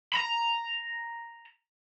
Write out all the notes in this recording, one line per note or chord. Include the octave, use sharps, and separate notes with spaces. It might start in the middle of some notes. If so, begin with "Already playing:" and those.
A#5 B5